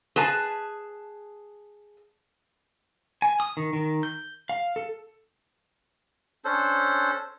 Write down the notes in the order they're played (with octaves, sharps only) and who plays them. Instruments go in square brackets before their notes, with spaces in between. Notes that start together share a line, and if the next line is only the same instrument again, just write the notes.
[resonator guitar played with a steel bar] G#4 B4 A5
[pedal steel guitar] G#5
D#6
D#3
D#3
G6
F5
A4
[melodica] C#4 D4 A4 C5